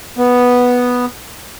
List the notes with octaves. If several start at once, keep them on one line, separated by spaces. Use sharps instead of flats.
B3